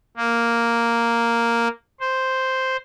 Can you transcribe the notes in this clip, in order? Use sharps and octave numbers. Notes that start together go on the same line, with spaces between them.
A#3
C5